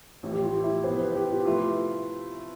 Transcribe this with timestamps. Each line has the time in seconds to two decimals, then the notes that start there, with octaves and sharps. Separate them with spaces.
0.23 A1 A2 F3
0.33 G4
0.43 F4
0.64 E4
0.84 C3 F3 B3 F4 C5
0.99 B4
1.15 G4
1.30 F4
1.46 C3 F3 A3 E4 F4 B4